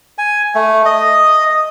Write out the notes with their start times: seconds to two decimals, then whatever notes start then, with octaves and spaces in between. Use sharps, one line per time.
0.18 G#5
0.55 A3
0.86 D#5